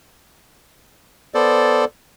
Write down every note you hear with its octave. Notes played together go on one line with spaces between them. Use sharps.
B3 A4 C5 D5